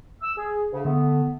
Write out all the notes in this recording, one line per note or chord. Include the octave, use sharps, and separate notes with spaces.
E6
G#4
D2 C#3
D3 A3 B3